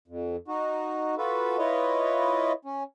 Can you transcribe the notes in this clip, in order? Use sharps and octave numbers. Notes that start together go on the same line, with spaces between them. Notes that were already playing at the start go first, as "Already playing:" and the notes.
F2
D#4 F#4
F4 F#4 A4 B4
E4 F4 B4 C#5 D#5
C#4